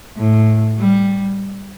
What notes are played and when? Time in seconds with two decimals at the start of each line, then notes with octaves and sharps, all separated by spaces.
0.17 A2
0.78 G3